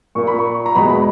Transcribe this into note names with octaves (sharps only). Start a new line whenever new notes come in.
A#2 A#3 C#6
B5
C#6
A#5
E2 B2 G#3 B5
B5